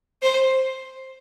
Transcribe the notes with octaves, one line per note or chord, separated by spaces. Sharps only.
C5